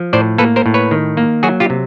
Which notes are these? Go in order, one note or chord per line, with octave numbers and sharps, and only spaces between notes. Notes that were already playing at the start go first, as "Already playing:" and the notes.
Already playing: F3
A2 C5 D5
A#3 A4 B4
A#4 C5
A2
B4 C#5
D#3
A#3
F#3 F#4 G#4
F4 G4
C3